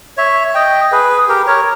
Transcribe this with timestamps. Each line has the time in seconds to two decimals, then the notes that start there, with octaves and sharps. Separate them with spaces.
0.17 C#5 E5
0.55 D#5 G5
0.92 G#4 B4
1.29 G4 A#4
1.47 A#4 C#5